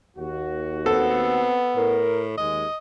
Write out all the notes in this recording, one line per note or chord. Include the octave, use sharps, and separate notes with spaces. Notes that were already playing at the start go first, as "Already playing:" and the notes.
D#2 F#4
B3 C4 A4
A2 A#4
D#2 G#3 D#5